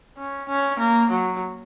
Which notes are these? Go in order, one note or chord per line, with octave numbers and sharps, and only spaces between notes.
C#4
C#4
A#3
F#3